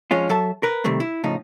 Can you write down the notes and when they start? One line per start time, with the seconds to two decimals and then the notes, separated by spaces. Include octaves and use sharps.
0.11 F2 G#3 C#4 F4
0.29 F#3 A4 E5 A5
0.63 A#4 B4
0.84 C3 D#3 G3 A3 C4
1.00 E4
1.24 A2 C#3 F3 D#4